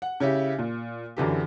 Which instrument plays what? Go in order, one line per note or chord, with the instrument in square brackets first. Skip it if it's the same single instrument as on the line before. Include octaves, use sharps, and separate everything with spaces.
[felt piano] F#5
C#3 C#4 E4 G4
A#2
F#2 D3 E3 G4